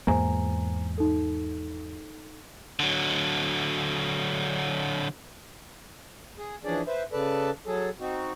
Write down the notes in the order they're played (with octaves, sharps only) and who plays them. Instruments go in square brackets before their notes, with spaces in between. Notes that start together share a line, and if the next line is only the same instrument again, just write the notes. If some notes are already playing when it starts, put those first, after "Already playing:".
[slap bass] E2 G#2 A#3 [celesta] C5 G#5 A#5
[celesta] D#4 A4
[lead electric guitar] D3 F#3
[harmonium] G#4
E3 F3 C#4 D4 G#4 D5
B4 C5 E5
C#3 A4 B4 D5 A5
F#3 G#4 A4
C4 D#4 F#4